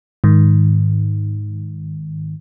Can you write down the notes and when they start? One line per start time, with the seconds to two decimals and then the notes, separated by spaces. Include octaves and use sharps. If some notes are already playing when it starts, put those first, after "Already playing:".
0.24 G#2 D#3